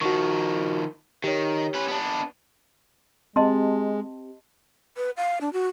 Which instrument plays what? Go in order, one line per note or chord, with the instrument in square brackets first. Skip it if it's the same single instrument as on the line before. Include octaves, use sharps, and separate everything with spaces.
[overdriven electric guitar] D#3 F3 [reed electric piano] F#4 C#6
[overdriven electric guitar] D#3 [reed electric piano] G4 C#5
[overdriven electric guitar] C#4 B4
B3 D4
[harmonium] G#3 [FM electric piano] C4 G4 [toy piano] D#5 A5 C6
[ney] B4
F5
D4
F#4